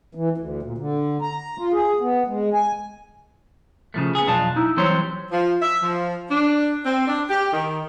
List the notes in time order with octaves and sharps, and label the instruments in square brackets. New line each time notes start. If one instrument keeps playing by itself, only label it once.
[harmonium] E3
D2
A#2
D3
A#5
F4
G#4
B3
G#3
G#5
[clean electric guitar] C#3 F3 A3
B3 G#4
B1 F2 D4 F4 A5
D#4 E4
E3 F#3 G3 C4 C5 C#5
[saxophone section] F3
E5
F3
D4
C4
D4
G4
D#3